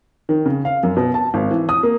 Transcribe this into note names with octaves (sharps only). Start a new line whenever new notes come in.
D#3
C#3
F5
F#2
B2
A5
G#1
E3
D#6
A#3